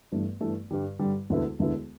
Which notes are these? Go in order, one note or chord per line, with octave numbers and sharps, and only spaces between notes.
G1 G2 E3 A3
G1 G2 E3 A3
G2 D3 G3
G2 D3 G3
E1 D2 D3 B3 E4
E1 D2 D3 B3 E4